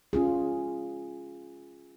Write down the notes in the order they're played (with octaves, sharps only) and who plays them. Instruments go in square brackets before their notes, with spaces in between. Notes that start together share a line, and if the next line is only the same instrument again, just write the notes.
[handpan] C#4 F4 G#4